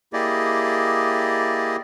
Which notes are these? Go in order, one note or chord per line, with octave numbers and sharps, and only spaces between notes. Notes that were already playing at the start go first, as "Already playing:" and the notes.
A#3 E4 G4 G#4 D5 D#5